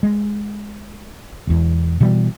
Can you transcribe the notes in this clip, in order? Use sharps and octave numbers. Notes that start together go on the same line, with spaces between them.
G#3
E1 E2
B2 E3 G3